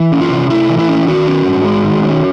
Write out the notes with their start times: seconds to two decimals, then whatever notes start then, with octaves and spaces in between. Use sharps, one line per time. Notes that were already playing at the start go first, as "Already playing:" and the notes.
Already playing: E3
0.12 C#4
0.21 F4
0.30 C3
0.50 A3 E4
0.69 E3
0.79 E4
0.88 C#4
1.07 D#3 F#4
1.27 C#4
1.45 G#2
1.64 G#3
1.84 D#3
2.03 C#4